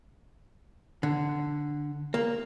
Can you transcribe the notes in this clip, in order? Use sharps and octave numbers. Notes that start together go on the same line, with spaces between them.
D3
A#3